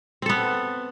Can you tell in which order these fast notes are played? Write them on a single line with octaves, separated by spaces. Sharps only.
C4 A4 B3